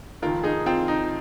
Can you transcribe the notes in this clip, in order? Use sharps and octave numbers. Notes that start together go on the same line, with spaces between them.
F1 D#2 D#3 F4 A#4
D#4 G#4
C4 F4
D#4